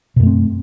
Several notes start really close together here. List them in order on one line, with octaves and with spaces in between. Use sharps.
B2 F#2 A3 C4